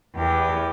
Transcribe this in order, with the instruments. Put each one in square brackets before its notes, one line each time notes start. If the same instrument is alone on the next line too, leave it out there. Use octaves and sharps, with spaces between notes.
[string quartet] E2 E3 G4